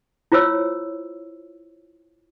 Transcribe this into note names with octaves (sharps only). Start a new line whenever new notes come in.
E4 F4 C5 C#5 E6